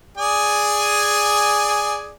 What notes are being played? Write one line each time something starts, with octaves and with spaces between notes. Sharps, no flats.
G#4 D5 G#5